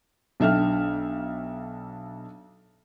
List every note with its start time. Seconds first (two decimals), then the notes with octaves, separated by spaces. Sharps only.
0.40 B1 D4 E5 G5 F6